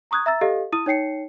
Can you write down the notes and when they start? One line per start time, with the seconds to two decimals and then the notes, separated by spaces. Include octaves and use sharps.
0.11 A#5 C#6 D#6 F#6 G#6
0.26 E5 A#5 E6 A6
0.41 G4 A4 D#5 F5
0.72 E4 D#6 D#7
0.86 D#4 C#5 G5 C7 C#7